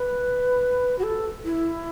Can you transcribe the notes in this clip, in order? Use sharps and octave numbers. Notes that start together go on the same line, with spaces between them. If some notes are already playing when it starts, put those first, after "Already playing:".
Already playing: B4
F#4
A4
E4